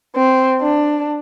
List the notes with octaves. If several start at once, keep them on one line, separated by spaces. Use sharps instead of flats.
C4
D4